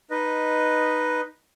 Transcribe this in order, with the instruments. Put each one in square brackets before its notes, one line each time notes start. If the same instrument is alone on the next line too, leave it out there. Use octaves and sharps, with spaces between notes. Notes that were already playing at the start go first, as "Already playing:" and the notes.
[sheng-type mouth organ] D#4 B4 D#5